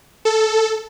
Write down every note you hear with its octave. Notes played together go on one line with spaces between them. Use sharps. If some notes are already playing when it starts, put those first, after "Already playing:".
A4